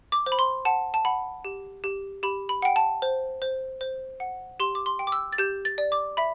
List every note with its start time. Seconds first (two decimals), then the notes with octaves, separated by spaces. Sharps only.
0.12 D6
0.26 C5
0.32 B5
0.39 C6
0.65 F#5 A5
0.94 A5
1.05 F#5 B5
1.45 G4
1.84 G4
2.23 G4 B5
2.49 B5
2.62 F#5 G5
2.76 A5
3.02 C5
3.42 C5
3.81 C5
4.20 F#5
4.60 G4 C6
4.75 D6
4.86 C6
4.99 G5
5.07 D6
5.12 E6
5.33 A6
5.38 G4 G6
5.65 A6
5.78 D5
5.92 D6
6.17 E5 B5